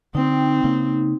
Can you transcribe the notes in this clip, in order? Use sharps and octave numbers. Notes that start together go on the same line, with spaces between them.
D3 C4 D#4 G5
C#3 A#3 D#4